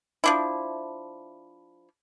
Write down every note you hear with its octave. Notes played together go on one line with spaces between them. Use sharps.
F3 D4 E4